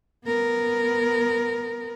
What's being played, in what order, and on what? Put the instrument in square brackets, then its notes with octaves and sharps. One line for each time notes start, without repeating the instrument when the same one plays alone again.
[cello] B3 A#4